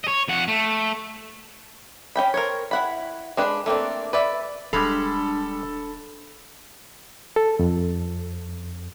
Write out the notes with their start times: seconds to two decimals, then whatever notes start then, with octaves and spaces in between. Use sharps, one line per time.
0.04 C#5 D#5
0.28 F2 F#5
0.48 A3
2.16 C#4 E4 G5 B5
2.34 A#4 C5 C#5
2.71 E4 F#5 B5
3.37 G#3 D4 B4
3.66 A3 A#3 C4 D4
4.13 B4 D5 E5
4.73 D#1 G3 G#3 D4 A4 F5 B5
7.36 A4
7.59 F2